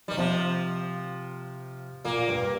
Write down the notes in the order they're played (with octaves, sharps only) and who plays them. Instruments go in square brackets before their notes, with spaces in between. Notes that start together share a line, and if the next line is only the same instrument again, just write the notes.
[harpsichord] D#3 [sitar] G3
[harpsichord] C3 [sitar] F3
[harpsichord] A#2 [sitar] A#3
[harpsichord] G2